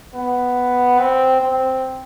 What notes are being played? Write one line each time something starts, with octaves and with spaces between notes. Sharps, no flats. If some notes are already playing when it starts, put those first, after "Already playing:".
B3
C4
C4